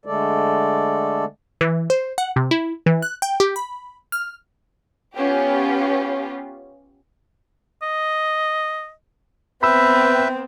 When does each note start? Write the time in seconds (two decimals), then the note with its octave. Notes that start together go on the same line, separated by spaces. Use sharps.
0.06 D3 G#3 A3 A4 D5
1.61 E3
1.90 C5
2.18 F#5
2.36 C3
2.51 E4
2.86 E3
3.02 F#6
3.22 G5
3.40 G4
3.56 B5
4.12 F6
5.16 B3 C#4 F4 G4
7.83 D#5
9.63 B3 C4 B4 E5 G5 B5 E6